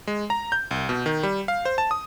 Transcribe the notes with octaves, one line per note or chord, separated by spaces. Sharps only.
G#3
A#5
G6
C2
B2
D#3
G3
F5
C5
A5
D#6